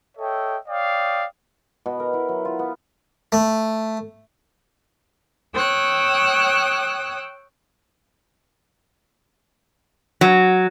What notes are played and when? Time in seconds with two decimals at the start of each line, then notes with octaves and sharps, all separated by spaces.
0.18 A4 C#5 D#5 E5 G5
0.68 C#5 D5 F5 G5 D#6
1.86 B2
2.00 A#4
2.13 E4
2.29 F#3
2.45 F4
2.59 B3
3.32 A3
5.55 C#5 G5 D#6 E6 F#6
10.21 F#3